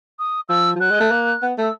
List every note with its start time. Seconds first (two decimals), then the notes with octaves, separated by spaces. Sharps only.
0.19 D#6
0.49 F3 E6
0.75 F3
0.80 F#3 F#6
0.90 G#3
1.00 A3
1.11 A#3
1.42 B3
1.58 A3 E6